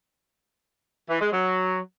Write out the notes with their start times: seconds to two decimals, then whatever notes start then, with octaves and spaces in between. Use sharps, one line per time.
1.09 E3
1.21 G#3
1.32 F#3